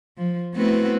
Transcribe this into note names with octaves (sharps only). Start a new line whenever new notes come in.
F3
A3 B3 C4 E4 F#4 B4